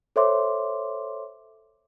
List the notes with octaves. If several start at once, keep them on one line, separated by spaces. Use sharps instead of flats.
A4 C5 C#5 E5 C6 D6